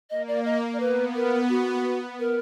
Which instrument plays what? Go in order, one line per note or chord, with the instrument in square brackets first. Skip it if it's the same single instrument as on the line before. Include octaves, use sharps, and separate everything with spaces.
[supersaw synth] A#3 [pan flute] D#5
[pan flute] D5
D#5
D5
[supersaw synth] B3 [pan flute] B4
[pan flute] A#4
F#4
A#4